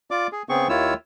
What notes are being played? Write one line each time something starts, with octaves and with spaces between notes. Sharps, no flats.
F4 D5 D6
G#4
C#3 B3 C4 G#4 C#6
D#2 D#3 E4 F4 C#5 E6